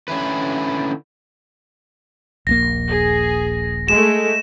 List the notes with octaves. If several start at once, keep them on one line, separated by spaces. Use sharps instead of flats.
D3 C#4 E4 B4
D#1 A#1 A#3 A#6
G#4
G#3 A3 E7